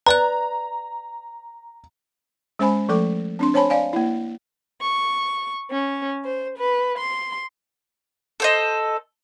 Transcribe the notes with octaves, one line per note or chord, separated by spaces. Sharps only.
B4 D5 A#5 F#6
G#3 C#4 C5 G#5 B5
F3 A3 A4 D6
C4 D4 C6
C5 C#5 G#5 A5 B5
D5 F5 G#5
A#3 E4
C#6
C#4
C5
B4
C6
A4 C5 D#5